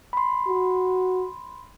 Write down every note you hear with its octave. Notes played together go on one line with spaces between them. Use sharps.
B5 C6
F#4